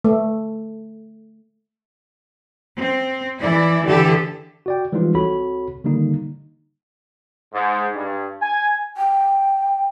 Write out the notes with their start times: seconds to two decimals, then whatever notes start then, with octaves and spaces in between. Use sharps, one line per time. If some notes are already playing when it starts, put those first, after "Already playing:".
0.04 A3
2.79 C4
3.39 E3 E4 D5
3.84 D3 E3 G4 A4
4.66 F#4 D5 G5
4.92 E3 F3 G3 G#3 D#4 F4
5.14 C2 C4 F#4 A4 C#5 B5
5.84 D3 D#3 G3 A#3 D#4
7.54 G#2
7.95 G2
8.41 G#5
8.97 G5